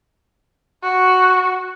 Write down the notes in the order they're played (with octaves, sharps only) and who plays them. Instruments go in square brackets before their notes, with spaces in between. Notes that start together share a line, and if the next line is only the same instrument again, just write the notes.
[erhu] F#4